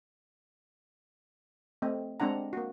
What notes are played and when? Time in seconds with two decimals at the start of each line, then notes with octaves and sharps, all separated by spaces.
1.82 A3 C4 D#5
2.20 G#3 C4 D4 F#5 A#5
2.53 A#3 F#4